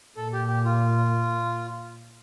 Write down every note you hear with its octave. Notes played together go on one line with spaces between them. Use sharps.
A#2 A4
G4
G4
F4